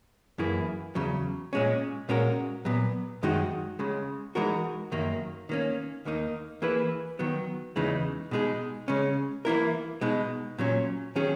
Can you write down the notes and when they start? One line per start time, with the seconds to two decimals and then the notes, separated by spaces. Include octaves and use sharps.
0.38 F#2 E3 A#3 E4 G#4
0.95 E2 C#3 F#3
1.53 A#2 G#3 C#4
2.09 A#2 G#3 C#4 F#4 A#4
2.65 A#2 F#3 B3
3.23 F#2 D#3 G#3 D#4 F#4
3.79 C#2 C#3 G#3
4.35 E3 G#3 D#4 F#4 A#4
4.92 F#2 D#3 F#3 A#3
5.49 D#3 A#3 C#4
6.05 D#2 D#3 A#3 D#4
6.62 E3 A#3 E4 G#4 B4
7.19 D#3 F#3 B3
7.76 E2 C#3 E3 G#3 D#4
8.31 B2 G#3 D#4 G#4
8.88 C#3 G#3 C#4
9.45 E3 A#3 E4 A#4
10.01 B2 G#3 D#4
10.59 A#2 F#3 C#4
11.16 D#3 F#3 C#4 G#4